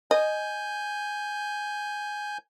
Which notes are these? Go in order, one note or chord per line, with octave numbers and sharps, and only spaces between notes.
D#5 G#5 G6